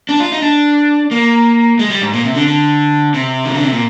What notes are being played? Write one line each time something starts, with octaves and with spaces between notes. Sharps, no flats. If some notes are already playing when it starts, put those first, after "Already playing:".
D4
F4
D#4
D4
A#3
G#3
G3
G#2
A#2
C3
D3
D3
C3
D#3
D3
C3
A#2